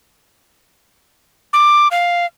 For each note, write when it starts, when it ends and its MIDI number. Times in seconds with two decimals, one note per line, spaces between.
1.53 1.88 86
1.91 2.26 77